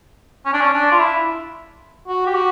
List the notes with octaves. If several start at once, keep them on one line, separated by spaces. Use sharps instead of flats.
C#4
D4
C#4
D4
F4
E4
F#4
G4
F#4